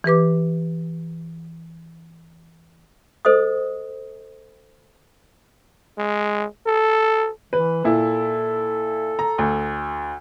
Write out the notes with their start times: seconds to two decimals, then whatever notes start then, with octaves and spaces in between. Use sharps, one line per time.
0.04 E3 G4 B4 D6
3.25 A4 C5 D#5 D#6
5.98 G#3
6.67 A4
7.53 E3 B4
7.84 A#2 E4 A4
9.19 A#5
9.38 D2